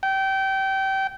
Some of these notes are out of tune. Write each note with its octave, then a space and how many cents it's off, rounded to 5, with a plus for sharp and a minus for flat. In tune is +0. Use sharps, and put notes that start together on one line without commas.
G5 -25